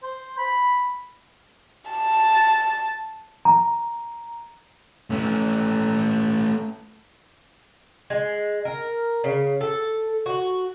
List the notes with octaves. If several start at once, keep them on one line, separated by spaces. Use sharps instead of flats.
C5
B5
A5
A#5
A3 C#4
G#3
A#4
C#3
A4
F#4